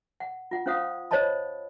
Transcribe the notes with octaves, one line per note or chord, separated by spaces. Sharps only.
F#5
F4 F#5
C#4 F4 C5 F5 F#5 D#6
C5 C#5 D#5 A5 B5